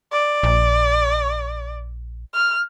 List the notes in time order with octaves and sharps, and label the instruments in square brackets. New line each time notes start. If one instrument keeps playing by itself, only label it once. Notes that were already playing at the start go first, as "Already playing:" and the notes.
[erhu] D5
[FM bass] A#1
[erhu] F6